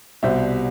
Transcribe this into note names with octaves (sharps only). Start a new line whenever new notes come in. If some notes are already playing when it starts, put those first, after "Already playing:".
C2 B2 G3 C5 E5